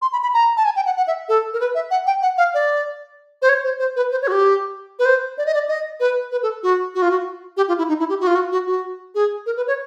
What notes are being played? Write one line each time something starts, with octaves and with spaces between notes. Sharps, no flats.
C6
B5
B5
A#5
A5
G#5
G5
F#5
F#5
E5
A4
A#4
B4
E5
F#5
G5
F#5
F5
D5
C5
C#5
C5
C5
B4
C5
C#5
F#4
G4
B4
C5
D5
D#5
D5
D#5
B4
B4
A4
F#4
F#4
F4
F#4
G4
F4
E4
D#4
E4
G4
F#4
F4
F#4
F#4
F#4
G#4
A#4
B4
C#5